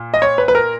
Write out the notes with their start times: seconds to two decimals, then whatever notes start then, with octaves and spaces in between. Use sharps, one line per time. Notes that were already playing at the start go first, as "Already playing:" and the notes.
Already playing: A#2
0.14 D#5
0.22 C#5
0.38 B4
0.48 B4
0.55 A#4